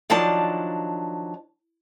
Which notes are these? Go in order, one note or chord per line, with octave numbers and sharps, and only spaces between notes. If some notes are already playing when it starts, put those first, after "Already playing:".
D#3 F3 F#3 D4 A5